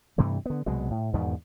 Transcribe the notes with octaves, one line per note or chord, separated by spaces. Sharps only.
G2 C3 E3 A3
D3 B3
C2 B2 F#3 G#3
A2
E2 G#2 B2 D#3